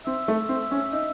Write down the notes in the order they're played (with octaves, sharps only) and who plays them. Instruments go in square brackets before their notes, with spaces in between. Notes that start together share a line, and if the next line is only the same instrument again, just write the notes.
[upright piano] C4 [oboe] E5
[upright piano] A3
C4
C#4
D#4